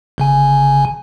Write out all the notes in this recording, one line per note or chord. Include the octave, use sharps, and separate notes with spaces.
G1 C#3 G#5